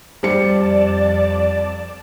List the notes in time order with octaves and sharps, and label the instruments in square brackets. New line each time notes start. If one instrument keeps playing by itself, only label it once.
[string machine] F2 D5 A5 [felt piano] G3 C5 C#7